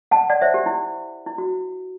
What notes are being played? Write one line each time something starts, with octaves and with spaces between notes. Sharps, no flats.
F#5 A5
D5 F#5
C5 E5
G4
E4
E4
F#4